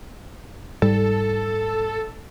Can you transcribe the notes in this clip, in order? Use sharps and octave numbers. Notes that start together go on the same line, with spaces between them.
G#2 G3 A4